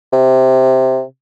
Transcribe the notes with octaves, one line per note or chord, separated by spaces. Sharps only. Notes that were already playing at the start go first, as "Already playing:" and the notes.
C3